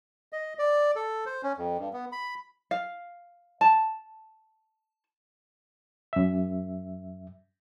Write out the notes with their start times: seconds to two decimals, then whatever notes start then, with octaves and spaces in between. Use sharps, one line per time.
0.33 D#5
0.59 D5
0.96 A4
1.26 C5
1.43 C#4
1.58 F2
1.79 G2
1.93 B3
2.12 B5
2.71 F5
3.61 A5
6.13 F#2 E5